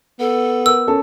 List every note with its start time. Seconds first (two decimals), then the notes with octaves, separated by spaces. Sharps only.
0.20 B3 A4
0.66 A#4 E6
0.87 C#4 A4 A#4